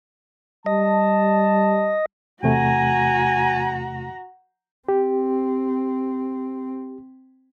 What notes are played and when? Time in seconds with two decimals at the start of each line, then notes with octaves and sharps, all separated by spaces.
0.66 G3 D#5 A5
2.43 E2 C3 A3 F#4 G#5 A#5
4.89 C4 G4